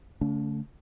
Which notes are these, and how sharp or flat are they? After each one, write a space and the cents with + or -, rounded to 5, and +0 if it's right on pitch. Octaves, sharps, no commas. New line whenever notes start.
D3 -45 A3 +0 C#4 +45